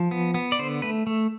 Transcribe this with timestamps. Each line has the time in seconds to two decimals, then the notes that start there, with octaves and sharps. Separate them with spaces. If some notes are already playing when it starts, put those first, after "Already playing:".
Already playing: F3
0.11 B3
0.34 B3
0.52 D5
0.59 D3 C5
0.82 A3 B4
1.07 A3